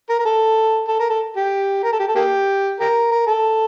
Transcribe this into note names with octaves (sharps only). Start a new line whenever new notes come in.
A#4
A#4
A4
A4
A#4
A4
G4
A#4
A4
G4
A4
A#3 G4
G4 A#4
A#4
A4